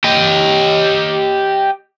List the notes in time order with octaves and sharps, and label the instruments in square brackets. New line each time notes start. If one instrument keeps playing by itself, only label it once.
[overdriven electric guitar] G4 D#5